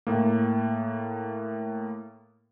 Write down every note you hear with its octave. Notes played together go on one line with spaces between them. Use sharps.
A2 A#3